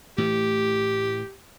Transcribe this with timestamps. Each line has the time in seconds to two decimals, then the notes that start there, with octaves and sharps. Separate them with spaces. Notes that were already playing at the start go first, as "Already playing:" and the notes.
0.18 A2 E3 A3 G4